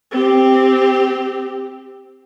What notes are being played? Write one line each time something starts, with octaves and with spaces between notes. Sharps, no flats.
C4 G4